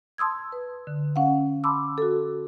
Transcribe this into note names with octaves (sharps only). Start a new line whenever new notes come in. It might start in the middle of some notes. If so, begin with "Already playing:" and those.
A5 C6 D#6 E6 G#6
B4
D3
C#4 F5 F#5
A5 B5 C6 D6 E6
F#4 A4